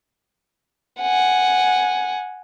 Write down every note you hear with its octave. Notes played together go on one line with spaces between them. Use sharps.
F#5 G#5